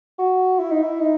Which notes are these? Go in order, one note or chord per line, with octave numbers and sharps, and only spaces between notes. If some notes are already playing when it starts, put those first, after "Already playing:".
F#4
E4
D#4
E4
D#4